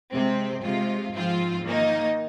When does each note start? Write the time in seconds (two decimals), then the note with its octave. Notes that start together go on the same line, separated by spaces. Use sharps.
0.13 C3 G#3 C4
0.63 C3 G#3 F4
1.14 G#2 F3 C4 F4
1.63 D#3 A#3 D#4